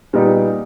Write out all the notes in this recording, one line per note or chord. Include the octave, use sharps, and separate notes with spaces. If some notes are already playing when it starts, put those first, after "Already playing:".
A#2 G3 B3 D#4 G4